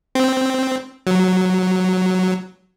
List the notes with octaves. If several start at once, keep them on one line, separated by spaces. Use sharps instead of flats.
C4
F#3